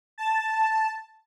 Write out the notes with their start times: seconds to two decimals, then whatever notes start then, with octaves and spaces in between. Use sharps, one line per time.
0.18 A5